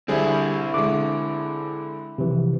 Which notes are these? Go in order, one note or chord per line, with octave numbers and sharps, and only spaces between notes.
D3 G3 C4 E4 G#4
D3 G#3 D6
C3 E3 F3